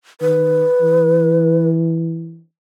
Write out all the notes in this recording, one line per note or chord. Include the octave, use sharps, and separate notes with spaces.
D#3 B4
E3